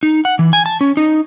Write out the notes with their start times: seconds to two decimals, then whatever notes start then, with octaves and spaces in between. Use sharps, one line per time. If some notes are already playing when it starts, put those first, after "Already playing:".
0.03 D#4
0.25 F#5
0.39 E3
0.53 G#5
0.66 A5
0.81 C#4
0.97 D#4